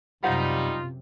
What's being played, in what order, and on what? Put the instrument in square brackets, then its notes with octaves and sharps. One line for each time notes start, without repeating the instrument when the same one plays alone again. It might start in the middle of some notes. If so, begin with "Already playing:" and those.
[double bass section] F#2 C3 [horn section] G3 D#4 [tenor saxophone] F4 [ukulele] C5 F5 F#5